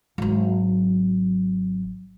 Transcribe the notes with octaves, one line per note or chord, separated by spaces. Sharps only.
G#1 F#3